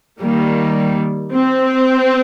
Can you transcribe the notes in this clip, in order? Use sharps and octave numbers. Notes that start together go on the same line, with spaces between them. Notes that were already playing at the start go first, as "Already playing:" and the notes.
D#3 G3 A#3
C4